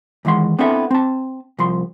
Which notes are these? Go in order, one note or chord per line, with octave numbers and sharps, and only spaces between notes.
D#2 E3 G#3 F#5 C6
B3 C4 D4 E4 A4 E5
C4 A5
C2 F3 C6